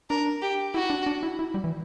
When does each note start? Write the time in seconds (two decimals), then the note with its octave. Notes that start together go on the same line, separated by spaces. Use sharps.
0.10 D4 A#4
0.42 G4
0.74 E4 F#4
0.90 D4
1.06 D4
1.23 E4
1.39 E4
1.54 G3
1.64 E3